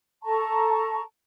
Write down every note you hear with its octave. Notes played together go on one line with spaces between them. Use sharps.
A4 A5 A#5 C#6